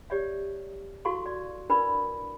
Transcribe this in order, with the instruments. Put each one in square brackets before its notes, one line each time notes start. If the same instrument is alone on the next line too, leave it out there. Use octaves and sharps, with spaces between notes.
[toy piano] G4 C#5 D5 E5
E4 F#4 A4 F5 C6 C#6
D5
D4 E4 A#4 B4 D5 B5